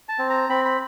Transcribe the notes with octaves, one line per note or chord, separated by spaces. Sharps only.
A5
C4
A#5
C4 B5
B5